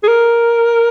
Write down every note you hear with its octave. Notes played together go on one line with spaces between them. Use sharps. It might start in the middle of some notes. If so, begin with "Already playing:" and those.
G#4
A#4